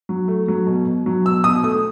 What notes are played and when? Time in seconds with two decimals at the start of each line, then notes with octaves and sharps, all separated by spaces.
0.09 F#3
0.28 A3
0.48 F#3
0.67 B2
0.87 B2
1.06 F#3
1.25 B2 E6
1.44 B2 D#6
1.64 A3 D#6